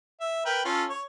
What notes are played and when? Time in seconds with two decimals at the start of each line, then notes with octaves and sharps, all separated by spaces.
0.21 E5
0.45 A#4 B4 G5
0.65 C#4 F4 A4
0.90 C#5